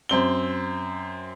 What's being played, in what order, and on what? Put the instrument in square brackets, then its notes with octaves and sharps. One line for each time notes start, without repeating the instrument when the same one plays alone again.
[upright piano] F#2 C4 G7